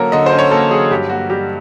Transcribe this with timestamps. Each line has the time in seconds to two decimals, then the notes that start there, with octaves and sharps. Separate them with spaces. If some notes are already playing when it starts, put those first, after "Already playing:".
Already playing: D3 F#3 A#3 C#4 A4 A#4
0.12 D3 D#5
0.26 C5
0.32 C#4
0.39 C#5
0.51 A#3 A4
0.71 F#3 G#4
0.91 G2 G4
1.10 A#3 F#4
1.30 G3 G4